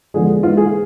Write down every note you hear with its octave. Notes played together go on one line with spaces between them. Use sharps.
E2 D3 F3 G#3 G#4
G#2 E3 G#3 F4
G#4